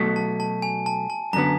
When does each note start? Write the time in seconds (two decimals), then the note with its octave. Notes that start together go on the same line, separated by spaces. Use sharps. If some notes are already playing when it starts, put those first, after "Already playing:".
Already playing: B2 F#3 A3
0.16 A5
0.40 A5
0.62 G#5
0.86 A5
1.10 A5
1.33 F#2 D3 F#3 B3 A#5